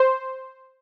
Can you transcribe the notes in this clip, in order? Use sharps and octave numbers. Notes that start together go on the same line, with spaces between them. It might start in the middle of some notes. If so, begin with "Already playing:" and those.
Already playing: C5